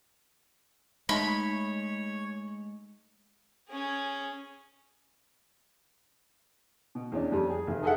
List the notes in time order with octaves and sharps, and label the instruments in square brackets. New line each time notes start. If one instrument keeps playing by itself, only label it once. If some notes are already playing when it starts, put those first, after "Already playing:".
[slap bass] G#3 A3 [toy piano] D#4 D#5 E5 [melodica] C#5 [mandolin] B5
[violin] C#4 G#4
[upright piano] B2
E2 C#4 D4
F2 G3
G#4
F1
D#4 G#4 A4 E5 F#5